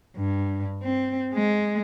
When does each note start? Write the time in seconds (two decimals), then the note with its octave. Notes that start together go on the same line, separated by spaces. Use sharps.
0.16 G2
0.83 C4
1.34 G#3